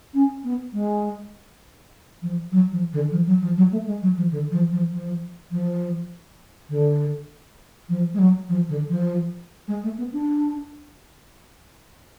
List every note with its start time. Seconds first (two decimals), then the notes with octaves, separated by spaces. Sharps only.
0.14 C#4
0.44 B3
0.73 G#3
2.22 F3
2.52 F#3
2.72 F3
2.93 D3
3.12 F3
3.27 F#3
3.42 F3
3.57 F#3
3.72 A3
3.86 G#3
4.02 F#3
4.17 F3
4.31 D3
4.51 F3
4.72 F3
4.92 F3
5.51 F3
6.70 D3
7.89 F3
8.14 G#3
8.19 F#3
8.49 F3
8.69 D3
8.90 F3
9.68 G#3
9.84 A3
9.98 B3
10.13 D4